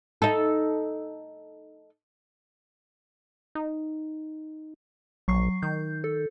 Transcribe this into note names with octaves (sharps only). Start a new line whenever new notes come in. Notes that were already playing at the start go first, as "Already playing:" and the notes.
D#4 A4
D#4
A#1 F#3 C#6 C7
D#3 G6
A4